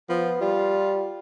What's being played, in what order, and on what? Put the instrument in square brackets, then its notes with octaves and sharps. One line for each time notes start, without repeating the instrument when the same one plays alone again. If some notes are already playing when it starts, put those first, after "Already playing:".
[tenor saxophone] F3 [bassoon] B3
[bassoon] G3 [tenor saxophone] F4